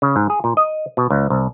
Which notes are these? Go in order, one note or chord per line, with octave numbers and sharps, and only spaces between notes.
C#3
G#2
G#4
A#2
D#5
B2
C#2
C2